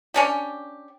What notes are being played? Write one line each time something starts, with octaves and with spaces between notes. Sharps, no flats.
C#4 D4 G4